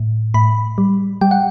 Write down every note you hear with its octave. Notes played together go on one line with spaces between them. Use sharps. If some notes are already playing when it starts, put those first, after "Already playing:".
Already playing: A2
A2 B5
G3
G3 G5
F#5